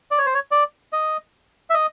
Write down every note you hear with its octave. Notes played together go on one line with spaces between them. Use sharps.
D5
C#5
C5
C#5
D5
D#5
E5
D#5